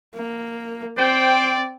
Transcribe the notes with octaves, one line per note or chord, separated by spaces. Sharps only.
A#3
C4 C5 D5 G5